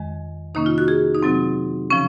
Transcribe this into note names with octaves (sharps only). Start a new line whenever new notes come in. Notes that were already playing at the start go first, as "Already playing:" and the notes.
Already playing: F2 D#3 G#3
C3 D#3 A#3 C#4 D#4
F4
F#4
G#4
D#4
C3 F#3 C4
C#3 F3 C#4